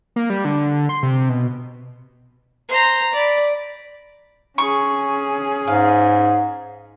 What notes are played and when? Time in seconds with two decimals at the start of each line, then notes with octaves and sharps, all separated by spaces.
0.16 A#3
0.30 G3
0.45 D3
0.89 C6
1.03 C3
1.30 B2
2.69 C5 A#5
3.14 D5 B5
4.58 C#4 G#4 C#6
5.67 G#2 F5